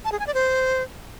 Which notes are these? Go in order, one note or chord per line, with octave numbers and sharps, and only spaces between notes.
A5
G#4
G#5
D5
C5